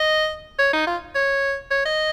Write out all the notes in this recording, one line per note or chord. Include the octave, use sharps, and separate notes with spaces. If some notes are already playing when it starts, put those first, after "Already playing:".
Already playing: D#5
C#5
D#4
F4
C#5
C#5
D#5